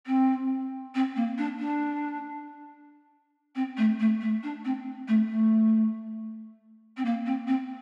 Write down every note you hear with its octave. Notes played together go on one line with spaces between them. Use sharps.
C4
C4
A#3
D4
D4
C4
A3
A3
A3
D4
C4
A3
A3
C4
A#3
C4
C4